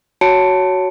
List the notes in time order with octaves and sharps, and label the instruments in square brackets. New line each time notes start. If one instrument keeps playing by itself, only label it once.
[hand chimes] F#4 C#5 A5 C#7 D7